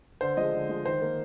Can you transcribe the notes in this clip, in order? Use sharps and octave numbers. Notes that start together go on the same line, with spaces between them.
D3 C5
F3 G#3 D#5
D3
F3 G#3
D#3 C5
A#3